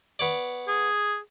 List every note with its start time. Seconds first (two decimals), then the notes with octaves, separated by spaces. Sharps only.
0.19 B3 C#5 D5
0.68 G#4